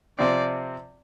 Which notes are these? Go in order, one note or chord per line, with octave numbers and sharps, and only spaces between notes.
C3 F3 C4 D5